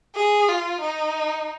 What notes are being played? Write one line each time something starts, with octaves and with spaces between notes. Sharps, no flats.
G#4
F4
D#4